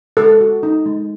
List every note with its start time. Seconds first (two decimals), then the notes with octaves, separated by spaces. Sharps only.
0.17 G#3 A4
0.41 F#4
0.63 D#4
0.86 G#3